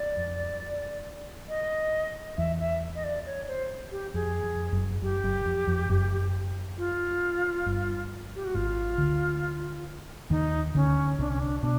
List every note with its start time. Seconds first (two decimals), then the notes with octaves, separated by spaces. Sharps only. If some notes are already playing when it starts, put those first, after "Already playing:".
Already playing: D5
0.17 F2
1.49 D#5
2.37 E2 E5
2.60 E5
2.95 D#5
3.04 D5
3.26 C#5
3.48 C5
3.92 G4
4.14 F2 G#4
4.43 F2
4.72 F#1 F#2
5.02 F#1 F#2 G4
5.23 F#1 F#2
5.45 F2
5.67 F2
5.89 F#1 F#2
6.78 F4
7.66 G1 G2
8.35 G4
8.45 F#4
8.54 G#1 G#2 F4
8.98 D2 D3
10.30 D#2 D#3 D#4
10.74 D2 D3 C#4
11.18 C2 C3 D4
11.29 C#4
11.40 D4
11.62 B2 D4